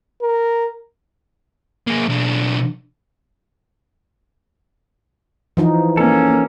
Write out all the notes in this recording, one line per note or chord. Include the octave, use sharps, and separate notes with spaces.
A#4
A#3 G#4
B1 D4
E3 F3 D#4
A#3 C#4 A4